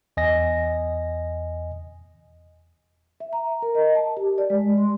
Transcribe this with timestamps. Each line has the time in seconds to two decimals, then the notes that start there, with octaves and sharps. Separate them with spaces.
0.17 E2 D#5 G#5 A#6
3.20 E5
3.33 A#5
3.62 A#4
3.75 D#5
3.95 A5
4.17 G4
4.38 D5
4.50 G#3
4.78 C6